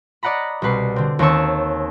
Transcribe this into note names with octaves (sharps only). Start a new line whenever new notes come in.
D5 D#5 F#5 A#5 B5
C2 B2 B4 C7
D3 C4
D#2 C4 C#4 A5 C#6 E6